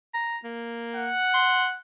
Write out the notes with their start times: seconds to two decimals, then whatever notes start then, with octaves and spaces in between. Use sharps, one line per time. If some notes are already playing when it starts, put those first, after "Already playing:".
0.14 A#5
0.44 A#3
0.96 F#5
1.34 C6